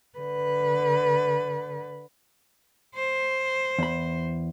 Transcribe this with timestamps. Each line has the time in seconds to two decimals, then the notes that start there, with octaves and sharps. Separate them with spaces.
0.19 D3 B4
2.95 C5
3.79 E2 B5